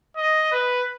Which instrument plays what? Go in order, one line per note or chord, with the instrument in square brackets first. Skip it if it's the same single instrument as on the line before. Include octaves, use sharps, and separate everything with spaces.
[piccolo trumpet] D#5
B4